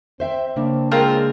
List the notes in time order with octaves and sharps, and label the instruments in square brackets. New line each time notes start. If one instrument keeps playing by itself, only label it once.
[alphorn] C4 [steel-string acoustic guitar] C5 E5 G5
[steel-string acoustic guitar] C#3 A#3 D4
[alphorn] G#3 [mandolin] C4 F4 A#4